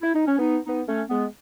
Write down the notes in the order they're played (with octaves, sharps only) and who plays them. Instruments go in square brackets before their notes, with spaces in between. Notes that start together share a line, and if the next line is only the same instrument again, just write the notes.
[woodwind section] E4
D#4
C#4
B3 D#4
B3 D#4
A3 C#4
G#3 B3